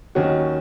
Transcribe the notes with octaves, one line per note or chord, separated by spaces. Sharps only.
D#2 D#3 F#3 C#4 F#4